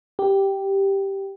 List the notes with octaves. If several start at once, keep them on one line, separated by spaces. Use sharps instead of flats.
G4